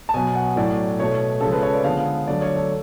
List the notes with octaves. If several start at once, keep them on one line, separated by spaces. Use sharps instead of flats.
A5
B2 F#3 B3 G#5
F#5
A2 F#3 A3 D5
B2 A3 C#5
C#3 F3 G#3 A4
B4
C#5
D5
D3 F3 G#3 B3 F5
D3 F#3 A3 D5
C#5
A4